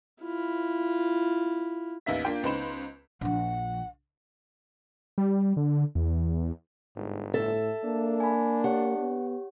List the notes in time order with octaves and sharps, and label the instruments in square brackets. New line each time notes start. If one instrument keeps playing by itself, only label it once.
[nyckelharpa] E4 F4
[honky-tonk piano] A1 D#2 B3 D#4 E5 B6
A#3 D4 F4 G5
C#2 B3 D#4 C5 B5 E7
[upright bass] A#1 F3 [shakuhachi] F#5
[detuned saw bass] G3
D3
E2
[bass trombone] G1 [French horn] G#2
[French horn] A2 [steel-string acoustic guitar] A4 E5
[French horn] A#3 [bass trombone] D4
[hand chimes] G#5 B5
[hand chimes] G4 C#5 [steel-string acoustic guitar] F#5
[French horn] B3